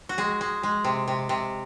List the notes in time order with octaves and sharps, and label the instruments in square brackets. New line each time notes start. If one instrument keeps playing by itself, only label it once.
[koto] F#4
G#3 G#4
G#3
G#3
C3
C3
C3